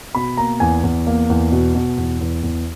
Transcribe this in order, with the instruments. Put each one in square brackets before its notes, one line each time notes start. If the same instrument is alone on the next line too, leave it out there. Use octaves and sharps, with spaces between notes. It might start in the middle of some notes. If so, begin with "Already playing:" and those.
[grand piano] B2 B5
A#3 A#5
E2 G#5
E2
A#3
E2
B2
B2
E2
E2
E2